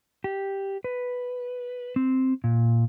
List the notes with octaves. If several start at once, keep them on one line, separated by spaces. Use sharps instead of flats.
G4
B4
C4
A#2